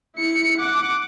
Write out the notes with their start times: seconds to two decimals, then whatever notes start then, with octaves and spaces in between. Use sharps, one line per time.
0.16 E4 C#7
0.58 F#5 D6